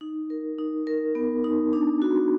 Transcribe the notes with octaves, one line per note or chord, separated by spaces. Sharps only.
D#4
A#4
D#4
A#4
B3
D#4
D4
F#4